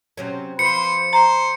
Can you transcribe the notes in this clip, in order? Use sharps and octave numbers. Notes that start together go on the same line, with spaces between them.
C3 F#3 C#4
F3 B4 C5 C6 C#7
C5 A#5